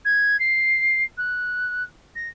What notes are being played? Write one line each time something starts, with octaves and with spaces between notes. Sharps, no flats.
G#6
C7
F#6
A#6